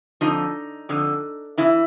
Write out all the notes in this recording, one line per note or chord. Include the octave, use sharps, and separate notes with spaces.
F2 D3 F3 D#4
F2 D3 F3
C#3 E3 E4